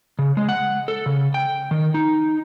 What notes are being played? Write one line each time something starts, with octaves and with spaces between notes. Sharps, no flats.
C#3
G#3
F#5
A4
C#3
G5
D#3
D#4